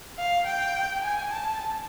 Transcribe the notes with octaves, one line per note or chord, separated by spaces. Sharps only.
F5
G5
G#5
A5